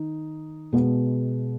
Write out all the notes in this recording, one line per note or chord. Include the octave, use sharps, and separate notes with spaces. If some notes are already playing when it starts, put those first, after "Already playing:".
Already playing: D#3 D#4
B2 G#3 B3